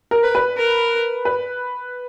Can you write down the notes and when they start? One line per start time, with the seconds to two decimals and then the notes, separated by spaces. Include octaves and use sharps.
0.11 A#4
0.23 B4
0.35 B4
0.57 A#4
1.25 B4